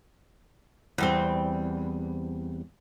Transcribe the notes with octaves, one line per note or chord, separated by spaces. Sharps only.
E2 G3 C4